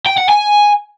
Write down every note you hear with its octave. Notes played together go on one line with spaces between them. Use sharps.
G5
F#5
G#5